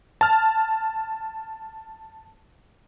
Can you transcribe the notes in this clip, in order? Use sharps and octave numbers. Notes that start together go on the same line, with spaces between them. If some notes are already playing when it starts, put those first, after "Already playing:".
A5 F6